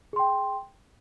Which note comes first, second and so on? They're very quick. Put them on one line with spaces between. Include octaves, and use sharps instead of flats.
G#4 C6 G5